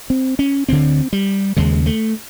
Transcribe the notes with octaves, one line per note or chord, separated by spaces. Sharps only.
C4
C#4
D2 D3 C4
G3
D#2 C#3 G#3
A3